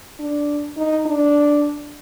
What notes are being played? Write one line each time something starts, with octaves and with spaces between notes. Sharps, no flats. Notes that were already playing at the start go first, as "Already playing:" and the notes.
D4
D#4
D4